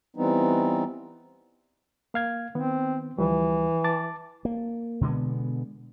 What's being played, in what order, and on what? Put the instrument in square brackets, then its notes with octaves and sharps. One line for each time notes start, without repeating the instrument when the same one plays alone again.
[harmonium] E3 G3 B3 C4 D#4
[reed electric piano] A#3 F5 G#6
[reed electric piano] D#3 B3 [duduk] C4
[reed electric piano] D2 F3 G3 [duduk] E3
[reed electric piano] A5 D6 A6
[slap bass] A#3
B2 D3 G#3 B3